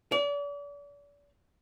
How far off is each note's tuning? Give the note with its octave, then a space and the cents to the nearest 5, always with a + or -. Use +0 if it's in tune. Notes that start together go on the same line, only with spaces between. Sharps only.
D5 -40